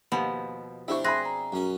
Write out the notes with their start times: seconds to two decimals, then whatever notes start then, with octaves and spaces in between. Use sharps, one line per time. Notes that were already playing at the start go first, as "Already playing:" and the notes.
0.12 D#2 B2 F3 B3
0.88 C4 D4 E4 G4 C#6
1.04 G#4 E5 B5 C6 F#6 A#6
1.25 A#5
1.52 F#2 C#4